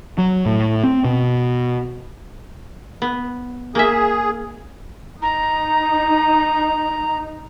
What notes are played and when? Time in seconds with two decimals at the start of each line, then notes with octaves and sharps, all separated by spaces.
0.18 F#3
0.46 A2
0.84 C4
1.05 B2
3.02 B3
3.75 A#3 G#4 E5
5.22 D#4 A#5